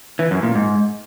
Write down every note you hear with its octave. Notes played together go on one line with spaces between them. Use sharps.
E3
F#2
A#2
G#2